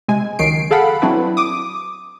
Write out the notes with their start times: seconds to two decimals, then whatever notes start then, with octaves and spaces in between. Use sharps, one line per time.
0.08 C3 G#3 G#5
0.39 C#2 D#3 F#3 C7 D7
0.71 G#4 A4 F5 F#5 B5
1.02 F#3 C4 D4 E4 B4
1.37 D6 D#6